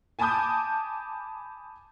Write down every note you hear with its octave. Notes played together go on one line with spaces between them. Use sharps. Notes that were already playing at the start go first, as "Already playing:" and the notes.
G#5 A5 B5 D6 D#6 G6